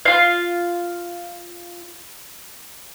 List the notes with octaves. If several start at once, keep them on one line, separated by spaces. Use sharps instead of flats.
F4 F5